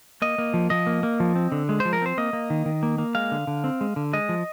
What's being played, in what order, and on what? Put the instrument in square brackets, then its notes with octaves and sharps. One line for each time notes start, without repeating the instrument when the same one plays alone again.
[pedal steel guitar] A#3 D#5
A#3
F3
F3 D#5
A#3
A#3
F3
C4
D3
G#3
C5
F3
A#4
C4 C5
A#3 D#5
A#3
D#3
D#3
A#3
A#3
G#3 F5
D3
D3
C4
G#3
D3
G#3 D#5
F3